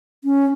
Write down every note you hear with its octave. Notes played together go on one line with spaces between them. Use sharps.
C#4